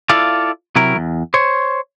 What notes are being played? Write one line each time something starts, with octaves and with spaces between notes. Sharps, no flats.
E4 F4 A4 D5 F5
C3 F#3 E4 A#4
E2
C5 C#5